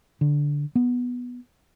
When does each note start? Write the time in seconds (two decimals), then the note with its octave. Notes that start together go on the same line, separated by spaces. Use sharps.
0.21 D3
0.75 B3